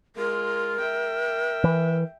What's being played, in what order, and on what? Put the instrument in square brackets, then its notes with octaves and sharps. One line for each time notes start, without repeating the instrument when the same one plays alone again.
[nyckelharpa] G#3 F4 [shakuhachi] A#4
[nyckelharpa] E5 G5
[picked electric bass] E3